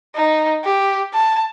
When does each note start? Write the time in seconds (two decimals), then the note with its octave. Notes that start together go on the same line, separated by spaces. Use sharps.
0.15 D#4
0.64 G4
1.14 A5